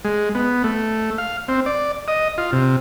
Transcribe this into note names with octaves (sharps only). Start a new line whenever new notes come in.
G#3
B3
A3
F5
C4
D5
D#5
F4
C3